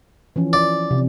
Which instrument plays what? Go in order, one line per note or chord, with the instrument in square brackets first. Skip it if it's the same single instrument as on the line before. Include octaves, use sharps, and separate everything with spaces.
[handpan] E3 F3 C#4
[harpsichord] D5
[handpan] C3